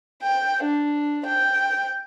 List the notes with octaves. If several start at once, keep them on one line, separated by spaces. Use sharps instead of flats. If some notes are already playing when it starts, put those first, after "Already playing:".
G5
D4
G5